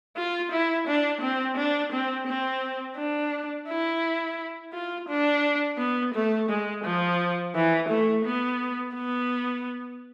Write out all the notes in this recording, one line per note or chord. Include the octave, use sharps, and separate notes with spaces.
F4
E4
D4
C4
D4
C4
C4
D4
E4
F4
D4
B3
A3
G#3
F3
E3
A3
B3
B3